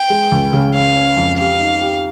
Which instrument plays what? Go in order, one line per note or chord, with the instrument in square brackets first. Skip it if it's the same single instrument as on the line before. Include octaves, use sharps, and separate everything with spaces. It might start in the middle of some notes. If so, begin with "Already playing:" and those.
Already playing: [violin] G5
[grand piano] G#3
C#2
C#3
[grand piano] C#4 [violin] F5
[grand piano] C#4
F2
[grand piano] G4 [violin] F5
[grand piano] D#4
G4